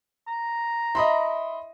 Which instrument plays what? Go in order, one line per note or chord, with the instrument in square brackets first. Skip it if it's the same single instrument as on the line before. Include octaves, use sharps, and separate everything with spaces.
[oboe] A#5
[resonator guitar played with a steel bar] E4 [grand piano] D#5 B5 C6